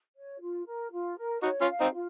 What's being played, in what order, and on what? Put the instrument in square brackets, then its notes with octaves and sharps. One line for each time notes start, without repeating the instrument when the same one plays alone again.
[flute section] C#5
F4
A#4
F4
A#4
[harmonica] D#4 F#4 [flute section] C#5
[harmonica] C#4 F4
[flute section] F5
[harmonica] C4 D#4
[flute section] F4